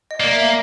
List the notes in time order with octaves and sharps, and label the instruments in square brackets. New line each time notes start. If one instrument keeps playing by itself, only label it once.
[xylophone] D#5
[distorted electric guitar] A#3 [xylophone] D5
[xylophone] E5
F5